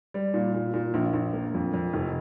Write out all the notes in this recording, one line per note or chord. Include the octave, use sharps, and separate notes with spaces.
G3
A#2
A#2
A#2
A#1
A#1
A#3
F2
F2
F1